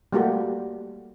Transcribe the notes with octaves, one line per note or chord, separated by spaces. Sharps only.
G3 A3 A#3 F#4 G4